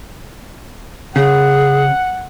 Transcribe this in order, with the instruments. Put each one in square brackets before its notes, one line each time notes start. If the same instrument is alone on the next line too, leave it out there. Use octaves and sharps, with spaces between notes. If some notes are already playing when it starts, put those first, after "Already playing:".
[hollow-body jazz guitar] C#3 [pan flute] G#4 [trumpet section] F#5